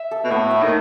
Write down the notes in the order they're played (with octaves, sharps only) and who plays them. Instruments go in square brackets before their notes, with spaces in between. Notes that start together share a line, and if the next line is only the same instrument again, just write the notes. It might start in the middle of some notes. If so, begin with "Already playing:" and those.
Already playing: [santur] E5
A4
[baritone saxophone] B2
[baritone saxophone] A2 [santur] B3
[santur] E5
[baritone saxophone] D#3